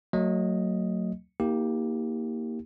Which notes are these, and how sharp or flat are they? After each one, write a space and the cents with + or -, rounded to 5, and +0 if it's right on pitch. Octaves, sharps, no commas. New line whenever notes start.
F#3 +0 A3 +40 D#5 +0
A#3 +0 D#4 +40 G4 +0